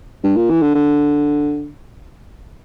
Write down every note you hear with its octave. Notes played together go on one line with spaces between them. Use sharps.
G2
A#2
E3
D3
D3